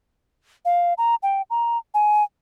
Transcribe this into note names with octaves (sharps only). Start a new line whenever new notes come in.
F5
A#5
G5
A#5
G#5